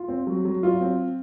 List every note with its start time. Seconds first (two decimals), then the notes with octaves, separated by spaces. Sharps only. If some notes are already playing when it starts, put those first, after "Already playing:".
Already playing: F4
0.08 C4
0.27 F#3
0.45 F#3
0.63 F4
0.81 C4